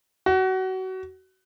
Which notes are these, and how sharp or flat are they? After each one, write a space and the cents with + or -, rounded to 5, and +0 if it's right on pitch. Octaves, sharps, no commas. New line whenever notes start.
F#4 +25